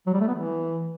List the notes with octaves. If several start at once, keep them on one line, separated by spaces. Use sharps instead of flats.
F#3
G3
A3
B3
E3